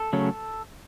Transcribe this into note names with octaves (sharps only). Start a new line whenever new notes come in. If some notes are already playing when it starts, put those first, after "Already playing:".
Already playing: A4
C#3 F#3 A3 C#4